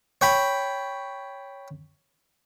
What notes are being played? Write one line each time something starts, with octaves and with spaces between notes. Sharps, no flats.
C#5 G5 B5